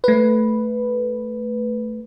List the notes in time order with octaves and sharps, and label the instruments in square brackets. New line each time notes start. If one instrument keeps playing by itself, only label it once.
[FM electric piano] A3 B4